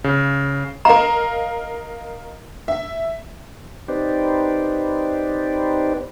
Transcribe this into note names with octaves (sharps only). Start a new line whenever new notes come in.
C#3
A#4 D#5 F5 A#5
E5
C4 D#4 G4 B4 C5 D5